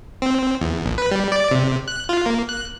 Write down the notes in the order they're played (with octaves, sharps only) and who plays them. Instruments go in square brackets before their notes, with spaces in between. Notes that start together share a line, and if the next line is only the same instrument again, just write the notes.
[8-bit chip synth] C4
E2
A#1
B4
G3
D5
C3
F#6
F4
A#3
F#6